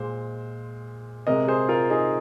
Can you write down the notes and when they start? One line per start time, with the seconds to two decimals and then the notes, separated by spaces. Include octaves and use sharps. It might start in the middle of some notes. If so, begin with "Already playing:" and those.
Already playing: A#2 G#3 C5
1.27 C3 G#3 A#4 D#5
1.48 G#4 C5
1.69 F4 A#4
1.90 D#4 G#4